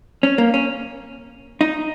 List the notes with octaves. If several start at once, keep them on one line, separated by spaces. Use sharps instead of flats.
C#4
A#3
C#4
D#4